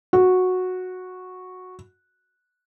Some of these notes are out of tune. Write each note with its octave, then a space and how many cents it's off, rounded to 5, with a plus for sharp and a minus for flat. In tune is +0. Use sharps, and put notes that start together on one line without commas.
F#4 -10